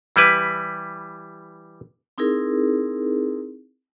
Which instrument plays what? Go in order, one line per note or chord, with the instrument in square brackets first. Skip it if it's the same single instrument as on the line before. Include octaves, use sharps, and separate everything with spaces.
[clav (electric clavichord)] E3 G3 E4 B4
[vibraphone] C4 D#4 E4 G#4 A#4